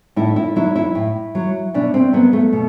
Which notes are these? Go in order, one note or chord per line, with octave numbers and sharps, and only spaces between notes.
A2 E4
E4
F#3 E4
E4
A2
F#3
B2 D4
C4
F#3 B3
A3
B2